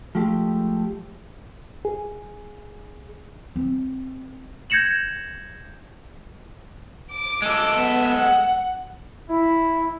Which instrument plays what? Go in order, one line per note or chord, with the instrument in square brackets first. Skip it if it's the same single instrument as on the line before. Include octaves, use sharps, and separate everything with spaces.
[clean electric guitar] F3 G#3 A3 G4
[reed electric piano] G#4
[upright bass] C4
[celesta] G6 G#6 A#6 C#7 E7 F#7
[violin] D6 D7
[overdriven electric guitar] G#3 A4
[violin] B3
F#5
[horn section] E4